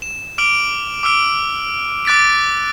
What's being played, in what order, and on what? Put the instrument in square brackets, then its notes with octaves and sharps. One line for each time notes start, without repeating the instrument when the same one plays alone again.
[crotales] E7
D6 F6 D7 F#7
D6 E6 F6 D7
D6 F#6 A6 B6 D7